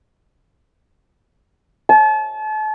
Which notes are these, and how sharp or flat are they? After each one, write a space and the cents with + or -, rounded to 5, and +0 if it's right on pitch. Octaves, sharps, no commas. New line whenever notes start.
A5 -35